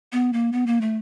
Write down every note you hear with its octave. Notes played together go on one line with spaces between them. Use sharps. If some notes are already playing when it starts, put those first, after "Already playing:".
B3
A#3
B3
A#3
A3